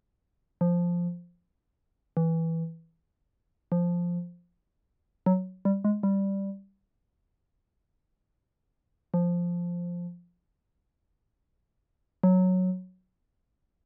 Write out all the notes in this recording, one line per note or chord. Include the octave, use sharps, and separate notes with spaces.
F3
E3
F3
F#3
G3
G#3
G3
F3
F#3